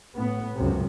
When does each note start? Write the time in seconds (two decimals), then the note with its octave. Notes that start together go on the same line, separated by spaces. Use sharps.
0.16 A2 B3
0.55 C#2 F#2 C3